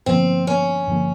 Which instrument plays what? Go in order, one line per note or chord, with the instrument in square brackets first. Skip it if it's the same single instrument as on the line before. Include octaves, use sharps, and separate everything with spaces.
[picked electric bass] G2 D3 F3 A#3 [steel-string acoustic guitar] C4
[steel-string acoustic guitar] C#4
[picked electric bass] G2 D3 F3 A#3